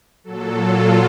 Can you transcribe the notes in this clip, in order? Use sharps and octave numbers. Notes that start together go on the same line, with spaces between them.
A#2 F#3 A4
F4